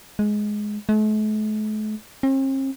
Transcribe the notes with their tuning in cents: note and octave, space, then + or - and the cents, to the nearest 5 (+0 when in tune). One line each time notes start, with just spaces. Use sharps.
G#3 +10
A3 -45
C4 +45